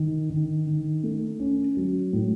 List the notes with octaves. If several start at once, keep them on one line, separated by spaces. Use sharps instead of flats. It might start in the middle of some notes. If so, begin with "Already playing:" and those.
Already playing: D#3
D#3
D#3
A3
C#4
F#3
A2